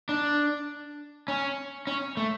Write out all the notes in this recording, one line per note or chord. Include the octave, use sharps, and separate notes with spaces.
D4
C#4
C#4
A3